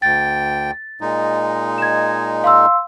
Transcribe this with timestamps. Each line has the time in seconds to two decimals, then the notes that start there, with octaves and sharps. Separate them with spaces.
0.02 D2 G5 A6
1.01 A#2 G#3 D#4
1.78 G#6 E7
2.44 F5 C6 E6